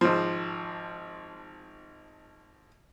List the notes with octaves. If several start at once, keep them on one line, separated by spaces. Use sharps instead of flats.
G#1 F3